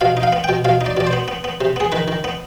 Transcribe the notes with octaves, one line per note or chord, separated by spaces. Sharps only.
B2 F5
D#4
F5
B3
B2 G5
B2 F5
D#4
D5
B2 D5
C5
B3
B3
B3
C3
B3 G#4
D#3 B4
D#3
B3